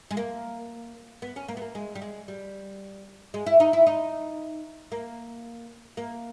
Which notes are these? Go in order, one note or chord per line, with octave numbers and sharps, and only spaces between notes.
G#3
A#3
B3
C#4
A#3
B3
A#3
G#3
G3
G#3
G3
G#3
E4
D#4
E4
D#4
A#3
A#3